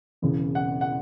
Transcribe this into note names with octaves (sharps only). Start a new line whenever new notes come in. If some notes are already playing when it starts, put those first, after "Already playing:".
E1 E2 C#3
F#5
F#5